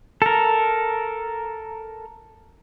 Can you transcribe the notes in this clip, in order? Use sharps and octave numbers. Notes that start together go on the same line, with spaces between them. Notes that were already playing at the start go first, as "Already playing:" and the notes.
A4 A#4